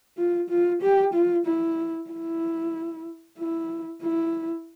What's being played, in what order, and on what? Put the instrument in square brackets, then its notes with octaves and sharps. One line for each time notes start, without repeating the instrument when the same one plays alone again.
[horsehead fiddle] F4
F4
G4
F4
E4
E4
E4
E4